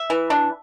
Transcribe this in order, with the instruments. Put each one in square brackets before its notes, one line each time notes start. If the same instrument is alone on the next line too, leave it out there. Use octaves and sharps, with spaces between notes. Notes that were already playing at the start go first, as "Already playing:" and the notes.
Already playing: [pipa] E5
E3
D4